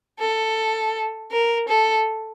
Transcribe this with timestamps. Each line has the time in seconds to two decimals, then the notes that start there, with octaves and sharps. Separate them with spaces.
0.20 A4
1.31 A#4
1.68 A4